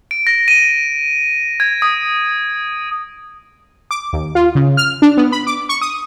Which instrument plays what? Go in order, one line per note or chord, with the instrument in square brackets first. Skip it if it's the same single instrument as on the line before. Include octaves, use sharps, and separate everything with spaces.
[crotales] D7
A#6
D#7
G#6
D#6
[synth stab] D6
D#2
F4
C#3
F6
D4
B3
B5
D6
C#6
D#6